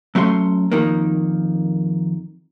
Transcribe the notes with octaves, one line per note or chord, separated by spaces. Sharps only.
F#3 A3 C#4 E5 C6
F2 D#3 A#3